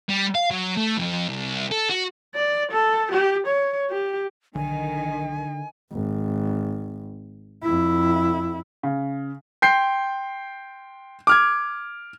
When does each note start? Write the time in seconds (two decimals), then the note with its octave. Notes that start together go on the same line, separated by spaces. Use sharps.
0.09 G3
0.35 F5
0.51 F#3
0.77 A3
0.97 F2
1.29 C2
1.71 A4
1.89 F#4
2.35 D5
2.72 A4
3.12 G4
3.47 C#5
3.90 G4
4.55 B1 D3 D#3 G#5
5.92 G#1
7.63 F2 E4
8.83 C#3
9.62 G5 C6 G6 C7
11.27 D6 F6 G#6